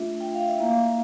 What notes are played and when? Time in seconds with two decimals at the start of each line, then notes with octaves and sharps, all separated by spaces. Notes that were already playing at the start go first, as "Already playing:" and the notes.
Already playing: A3 D4 F4 E5
0.21 G5
0.34 F5
0.48 E5
0.58 A#3 E4 F5